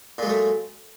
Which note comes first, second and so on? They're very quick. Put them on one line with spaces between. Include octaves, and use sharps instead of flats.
A#2 G#3 F#3 A3